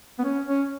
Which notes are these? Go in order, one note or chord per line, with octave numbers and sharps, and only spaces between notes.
B3
C#4
C#4